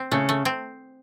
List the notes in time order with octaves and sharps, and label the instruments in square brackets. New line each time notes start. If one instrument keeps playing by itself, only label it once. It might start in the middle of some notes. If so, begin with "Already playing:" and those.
Already playing: [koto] C4
[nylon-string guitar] C#3 [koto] A3
[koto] A3
C4